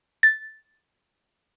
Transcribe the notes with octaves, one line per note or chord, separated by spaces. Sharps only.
A6